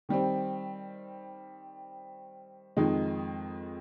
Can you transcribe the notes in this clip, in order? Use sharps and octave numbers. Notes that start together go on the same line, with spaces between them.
D#3 G3 C4
F2 D#3 G#3 D#4